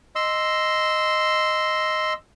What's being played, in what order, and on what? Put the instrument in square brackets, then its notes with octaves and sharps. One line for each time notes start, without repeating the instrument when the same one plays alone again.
[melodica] D#5 C6 E6